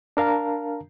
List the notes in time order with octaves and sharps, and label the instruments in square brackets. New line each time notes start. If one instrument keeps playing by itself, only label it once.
[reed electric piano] D4 A#4 F5 A5 A#5